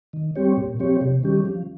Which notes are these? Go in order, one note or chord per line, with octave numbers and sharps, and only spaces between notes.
D#3
G3 C4 G4 C#5
A#2
F3 C4 G4 C#5
C3
D#3 G3 C#4 G4
F3